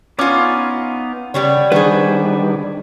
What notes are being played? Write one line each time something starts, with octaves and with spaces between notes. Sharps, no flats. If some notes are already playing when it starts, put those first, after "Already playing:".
B3 C#4 D#4 F4 D6
C#3 G3 B3 C#5
D#3 G3 B3 D4 G#4 B4 C5 C#6